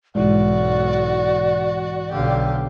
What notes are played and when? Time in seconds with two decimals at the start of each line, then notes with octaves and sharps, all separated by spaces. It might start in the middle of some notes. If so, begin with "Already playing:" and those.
0.15 B1 G#2 E3 F#4 D5
2.12 B1 D3 G4 F5